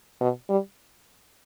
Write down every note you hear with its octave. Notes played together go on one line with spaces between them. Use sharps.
B2
G3